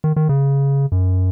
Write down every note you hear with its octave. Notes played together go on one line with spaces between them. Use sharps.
D#3
D#3
C#3
F#2